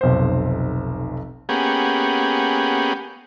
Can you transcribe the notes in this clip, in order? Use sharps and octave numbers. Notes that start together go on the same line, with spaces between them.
F1 B1 C5
A#3 B3 C#4 G4 G#4 F#5